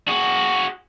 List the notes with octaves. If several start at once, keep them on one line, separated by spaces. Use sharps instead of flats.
F#4 G#4